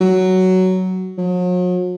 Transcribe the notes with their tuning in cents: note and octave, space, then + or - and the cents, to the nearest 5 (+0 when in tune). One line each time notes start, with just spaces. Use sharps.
F#3 +10
F#3 -45